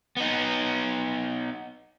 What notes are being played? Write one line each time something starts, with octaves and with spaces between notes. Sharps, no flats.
B3 D#4